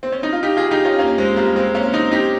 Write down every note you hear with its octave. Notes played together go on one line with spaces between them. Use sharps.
C4
C#4
D#4
F4
D#4 G4
F4 G#4
D#4 G4
C#4 F4
A#3 C#4
G#3 C4
G3 A#3
G#3 C4
A#3 C#4
C4 D#4
D#4 G4